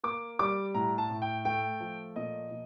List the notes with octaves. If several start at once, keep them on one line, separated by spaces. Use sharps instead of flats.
A#3 D6
G3 D6
A2 A#5
A5
A2
G5
A3 G5
F3
A#2 D#5
A#2